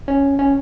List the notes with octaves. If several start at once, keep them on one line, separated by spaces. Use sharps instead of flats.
C#4
C#4